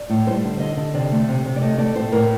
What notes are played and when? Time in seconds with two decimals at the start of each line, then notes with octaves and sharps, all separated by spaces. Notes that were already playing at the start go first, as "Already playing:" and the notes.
Already playing: D5
0.10 A2
0.27 G3 C5
0.44 D3
0.60 D3 D#5
0.77 D3
0.94 C3 D5
1.12 A3
1.29 C3
1.45 C3
1.56 D5
1.61 A3 D#5
1.78 A3 D5
1.95 A2 C5
2.12 A2 A#4